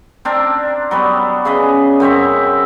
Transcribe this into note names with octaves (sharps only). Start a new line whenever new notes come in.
C4 D4 A#4
F#3 G3 B3
C#3 G#4 B4 D#5
F#2 C4 C#5 E5